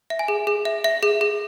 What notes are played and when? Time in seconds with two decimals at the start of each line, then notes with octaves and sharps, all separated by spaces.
0.10 E5
0.19 G#5
0.28 G#4
0.47 G#4
0.65 E5
0.84 E5
1.03 G#4
1.21 G#4